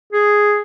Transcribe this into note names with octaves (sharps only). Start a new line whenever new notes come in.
G#4